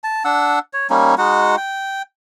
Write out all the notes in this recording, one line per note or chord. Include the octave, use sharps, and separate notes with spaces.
A5
D4 F#5 E6
C#5
G3 A#3 C#4 D#4
G#3 D#4 F#4 F#5
G5